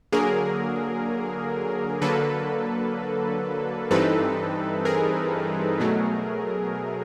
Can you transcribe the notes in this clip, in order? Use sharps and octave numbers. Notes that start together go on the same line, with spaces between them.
D3 F#3 A#3 G#4 A#4
D3 F#3 A#3 A4 B4
G2 E3 G3 C4 D#4 A4 B4
G#4 A#4
B2 F#3 A3